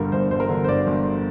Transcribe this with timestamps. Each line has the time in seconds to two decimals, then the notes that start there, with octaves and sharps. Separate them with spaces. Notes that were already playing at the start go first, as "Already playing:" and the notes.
Already playing: G1 G2 D3 A#4
0.12 G1 C5
0.31 G1 C5
0.40 A#4
0.49 D3
0.64 C5
0.68 G2 D5
0.87 G1